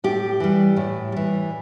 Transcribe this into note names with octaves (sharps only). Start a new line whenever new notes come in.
A2 G4
E3 G3
A2
E3 G3